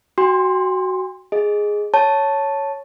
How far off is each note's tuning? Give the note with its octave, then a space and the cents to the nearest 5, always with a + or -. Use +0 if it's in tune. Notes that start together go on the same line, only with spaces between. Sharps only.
F#4 +10 G5 +45 C6 +10
G#4 +0 D#5 +0
C#5 +0 A5 +0